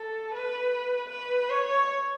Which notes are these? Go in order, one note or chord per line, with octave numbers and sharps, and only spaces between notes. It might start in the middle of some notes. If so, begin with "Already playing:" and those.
Already playing: A4
B4
B4
C#5